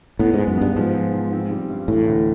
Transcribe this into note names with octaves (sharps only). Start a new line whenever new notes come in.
A2 B3
G#2 G#3
F#2
G2 B3
G#2 F3
F3
F3
C4
G3
G2
A2 E3
D2